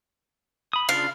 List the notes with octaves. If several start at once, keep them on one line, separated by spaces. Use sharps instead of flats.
B5 D#6
C#3 D4 F4 F5